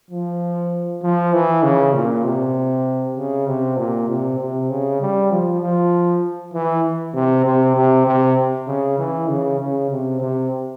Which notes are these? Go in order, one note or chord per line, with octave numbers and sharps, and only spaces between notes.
F3
F3
E3
C#3
A#2
C3
C#3
C3
A#2
C3
C3
C#3
G3
F3
F3
E3
C3
C3
C3
C3
C#3
E3
C#3
C#3
C3
C3